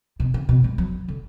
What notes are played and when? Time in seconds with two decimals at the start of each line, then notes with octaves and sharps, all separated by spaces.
0.20 B2
0.34 C#3
0.49 B2
0.64 G#3
0.78 F#3
1.08 D3